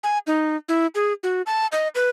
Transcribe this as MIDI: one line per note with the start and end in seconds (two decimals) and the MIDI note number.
0.03 0.18 80
0.27 0.57 63
0.69 0.87 64
0.95 1.13 68
1.23 1.42 66
1.46 1.67 81
1.72 1.88 75
1.95 2.10 71